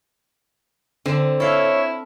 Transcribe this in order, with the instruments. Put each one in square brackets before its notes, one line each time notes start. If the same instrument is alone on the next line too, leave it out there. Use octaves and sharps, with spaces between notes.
[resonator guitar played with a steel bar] D3 [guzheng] C4
[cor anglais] E4 [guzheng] A4 F5 [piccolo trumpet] C#5